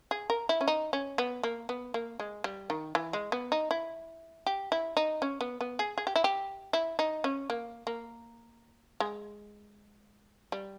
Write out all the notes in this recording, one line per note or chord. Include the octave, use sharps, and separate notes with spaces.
G#4
A#4
E4
C#4
D#4
C#4
B3
A#3
B3
A#3
G#3
G3
D#3
E3
G#3
B3
D#4
E4
G4
E4
D#4
C#4
B3
B3
G#4
G#4
G4
E4
G4
E4
D#4
C#4
A#3
A#3
G#3
G3